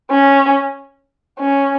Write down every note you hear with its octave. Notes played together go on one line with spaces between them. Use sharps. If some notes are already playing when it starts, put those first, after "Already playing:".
C#4
C#4